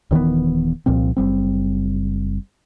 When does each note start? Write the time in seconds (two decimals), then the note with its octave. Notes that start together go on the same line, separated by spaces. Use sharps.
0.11 D#1 D#3 E3 B3
0.86 C2 A#2 F3 C4
1.17 F#1 G3 C4